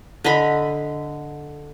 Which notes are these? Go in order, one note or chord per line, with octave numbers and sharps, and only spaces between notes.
D3 D#5 A#5 B5